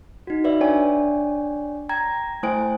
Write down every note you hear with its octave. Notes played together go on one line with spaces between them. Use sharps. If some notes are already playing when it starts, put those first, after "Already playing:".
D#4 F#4
B4 D5 E5
D4 C#5 D5 G5 G#5
G5 A#5 G#6
A3 E4 C5 G5 G#5 D7